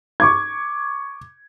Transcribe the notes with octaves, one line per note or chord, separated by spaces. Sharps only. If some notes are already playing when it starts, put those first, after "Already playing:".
C#6 D6 G#6